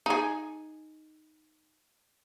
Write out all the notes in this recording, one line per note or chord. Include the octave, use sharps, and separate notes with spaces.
D#4 G#4